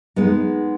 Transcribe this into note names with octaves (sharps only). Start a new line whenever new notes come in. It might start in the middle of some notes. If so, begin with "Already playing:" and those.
G#3 B3 D#4